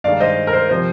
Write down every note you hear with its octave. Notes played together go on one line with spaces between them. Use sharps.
G2 D#3 G#3 D5 F5
C5 D#5
A#4
C5
C3 F3 C5